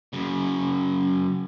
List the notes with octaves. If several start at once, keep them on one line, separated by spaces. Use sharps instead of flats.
F#2 C#3